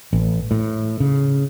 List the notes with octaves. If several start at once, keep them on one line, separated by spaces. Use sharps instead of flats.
A1
A2
C#3